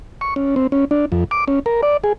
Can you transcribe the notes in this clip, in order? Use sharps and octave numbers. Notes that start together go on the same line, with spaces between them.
C#6
C#4
C4
C#4
D4
F2
D6
C#4
A#4
D5
G#4